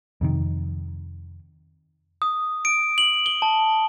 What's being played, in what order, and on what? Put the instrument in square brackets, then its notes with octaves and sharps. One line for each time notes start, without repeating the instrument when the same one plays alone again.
[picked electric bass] F2 C3 D#3
[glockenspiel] D#6
D7
F#7
G7
A5